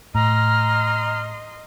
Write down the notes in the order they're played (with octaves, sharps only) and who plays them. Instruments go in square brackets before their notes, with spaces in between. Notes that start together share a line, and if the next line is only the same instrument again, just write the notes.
[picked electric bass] A2 [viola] D#5 C6 [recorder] A#5 [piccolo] F6